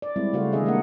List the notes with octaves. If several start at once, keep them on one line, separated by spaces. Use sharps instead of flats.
D5
G3 G#3 C4 E4
C#3 A3 F#4 C5 F5
D#3 E3 D4 G#4 D#5 E5
G#3 A#3 D4 G4 A#4 F#5